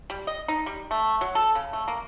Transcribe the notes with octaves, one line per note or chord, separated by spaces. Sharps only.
G3
D#5
D#4
G3
A3
F#3
A4
C#3
A3
A#3